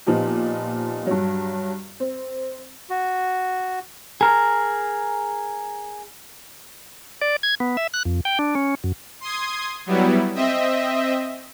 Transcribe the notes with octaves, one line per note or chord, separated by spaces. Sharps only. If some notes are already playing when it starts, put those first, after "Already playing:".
A#2 F3 B3 D#4 G4
G2 F#3
C4
F#4
G#4 A#4
D5
G#6
B3
E5
F#6
F2
G5
D4
C#4
F#2
C6 D#6 G#6
F#3 G3 B3 E4
C4 D#5 E5